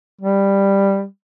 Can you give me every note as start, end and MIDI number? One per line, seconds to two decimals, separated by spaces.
0.21 1.04 55